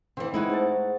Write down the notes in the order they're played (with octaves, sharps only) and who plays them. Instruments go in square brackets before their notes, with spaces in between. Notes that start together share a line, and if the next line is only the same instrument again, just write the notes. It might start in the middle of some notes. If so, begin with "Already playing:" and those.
[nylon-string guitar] D3 E3 [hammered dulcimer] C4 D#5
[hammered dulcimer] A2 F#5 [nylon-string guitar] G#3 D#4 E4
[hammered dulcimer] G#2 C#5 A5